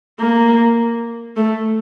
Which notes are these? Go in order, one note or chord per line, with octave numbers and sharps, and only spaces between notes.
A#3
A3